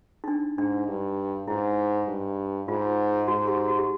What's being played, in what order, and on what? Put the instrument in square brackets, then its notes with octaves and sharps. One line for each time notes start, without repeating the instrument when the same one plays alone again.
[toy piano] D#4
D4
[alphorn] G#2 [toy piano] D4
[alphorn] G2
[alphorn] G#2 [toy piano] E4
[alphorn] G2
[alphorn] G#2 [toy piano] F4
[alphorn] G#2 [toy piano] F#4
[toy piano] G4
F#4
G4